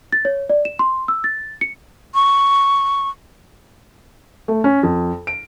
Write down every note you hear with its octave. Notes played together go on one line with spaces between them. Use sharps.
A6
C#5
D5
E7
C6
E6
A6
C#7
C#6
A3
C#4
F2
D7